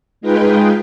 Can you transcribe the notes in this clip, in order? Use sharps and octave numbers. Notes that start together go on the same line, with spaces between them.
G#3 D#4 F4 G#4 B4 G5